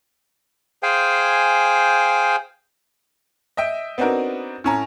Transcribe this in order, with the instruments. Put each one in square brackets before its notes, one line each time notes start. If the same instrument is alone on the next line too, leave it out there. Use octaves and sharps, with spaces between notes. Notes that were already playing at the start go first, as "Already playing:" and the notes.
[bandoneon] G#4 C5 F5 G5 G#5
[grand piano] D#5 E5 G5
B3 C4 D4 D#4 F#4 A#4
A2 C#4 A#5